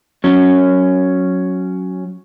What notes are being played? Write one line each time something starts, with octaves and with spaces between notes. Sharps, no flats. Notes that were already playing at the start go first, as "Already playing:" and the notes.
F#3 C#4